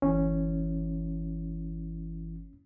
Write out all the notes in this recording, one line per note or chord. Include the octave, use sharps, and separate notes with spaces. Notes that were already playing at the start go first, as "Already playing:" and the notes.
G1 E3 C#4 E4